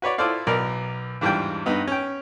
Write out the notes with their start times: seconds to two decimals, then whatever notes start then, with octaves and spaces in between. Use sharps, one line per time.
0.02 F#4 B4 C#5 D5
0.18 E4 F4 A4 C5 D5 F5
0.47 B1 B3 A#4 D5 A#5
1.21 E2 G#2 G3 D4 F4 G5
1.66 G2 B3 D#4
1.88 C#4 G5